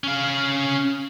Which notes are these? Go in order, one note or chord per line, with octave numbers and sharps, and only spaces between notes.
C#4 F5